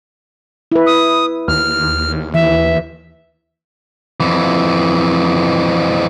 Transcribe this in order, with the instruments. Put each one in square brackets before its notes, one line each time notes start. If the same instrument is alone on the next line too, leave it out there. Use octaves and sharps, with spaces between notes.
[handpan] E4 B4
[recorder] D#6
[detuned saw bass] D#2 [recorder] F6
[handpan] E3 [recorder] E5
[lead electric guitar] F2 E3